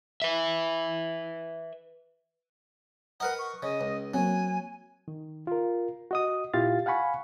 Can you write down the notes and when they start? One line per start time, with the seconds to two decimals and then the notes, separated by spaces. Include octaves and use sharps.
0.22 B4 E5
3.20 D#4 A#4 B4 F#5
3.39 C#6
3.63 C#3 D#5
3.81 C#2
4.14 F#3 A#3 C4 G#5
5.08 D#3
5.47 F4 A#4
6.11 F#4 D#5 D#6
6.54 A#2 E4 F4 G4 F5 A6
6.86 F5 F#5 G#5 B5 C#6